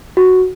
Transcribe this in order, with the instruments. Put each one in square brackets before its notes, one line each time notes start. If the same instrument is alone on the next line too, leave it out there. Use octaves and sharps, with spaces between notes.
[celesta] F#4